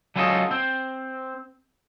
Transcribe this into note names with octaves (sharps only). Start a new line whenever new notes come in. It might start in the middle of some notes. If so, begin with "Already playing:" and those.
F#3 C#4 E4 F4 A4 D#5
C4